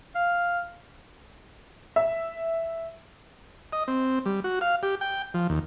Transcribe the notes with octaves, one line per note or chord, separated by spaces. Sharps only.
F5
E5
D#5
C4
G3
F#4
F5
G4
G5
F3
D#2